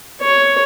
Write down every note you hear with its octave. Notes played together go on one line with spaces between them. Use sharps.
C#5